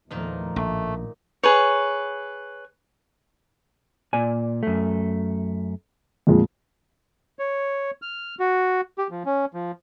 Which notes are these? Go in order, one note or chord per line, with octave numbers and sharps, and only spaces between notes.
E2 A#2 D#3 F3 A3 D#4
A#1 A2 A3
G#4 B4 C#5
A#2 D5 G#5
F#2 A3
F2 A#2 G#3
C#5
F6
F#4
G4
F3
C#4
F3